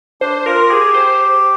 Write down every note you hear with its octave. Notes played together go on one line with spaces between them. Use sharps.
D4 C5
F4 A#4
G4 G#4
C5